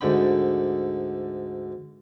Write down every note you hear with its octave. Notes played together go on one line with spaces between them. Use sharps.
D2 G#2 D3 G5 B5